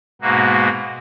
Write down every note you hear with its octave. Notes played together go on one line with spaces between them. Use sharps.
G#2 B2 A#3 F#4